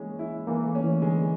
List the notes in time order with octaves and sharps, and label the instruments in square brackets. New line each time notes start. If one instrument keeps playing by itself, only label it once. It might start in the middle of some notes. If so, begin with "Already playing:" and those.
Already playing: [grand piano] E3 G#3 C#4 [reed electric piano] A#3
[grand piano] E4
[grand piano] E3 [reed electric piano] A#3
[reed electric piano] A3
[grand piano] C#4
[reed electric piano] E3
[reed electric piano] D3 [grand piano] G#3